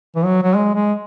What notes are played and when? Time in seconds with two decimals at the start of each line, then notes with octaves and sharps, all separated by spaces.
0.16 E3
0.25 F#3
0.43 F#3
0.55 G#3
0.74 G#3